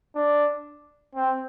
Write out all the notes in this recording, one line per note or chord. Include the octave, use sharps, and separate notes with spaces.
D4
C4